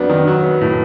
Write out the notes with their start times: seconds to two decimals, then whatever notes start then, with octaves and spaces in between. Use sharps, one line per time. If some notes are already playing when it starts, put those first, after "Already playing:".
Already playing: F2 F#3 B3 D4
0.09 D#3
0.27 F#3
0.43 B3
0.61 A2